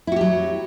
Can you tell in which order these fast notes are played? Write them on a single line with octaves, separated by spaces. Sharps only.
E4 F#4 G4 F#3